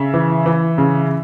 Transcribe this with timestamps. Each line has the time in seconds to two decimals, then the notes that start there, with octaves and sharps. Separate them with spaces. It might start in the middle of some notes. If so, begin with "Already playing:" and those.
Already playing: C#3 E5
0.14 E3
0.46 E3
0.78 C#3